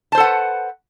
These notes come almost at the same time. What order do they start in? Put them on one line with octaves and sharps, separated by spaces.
A5 C5 A4 F#5 B4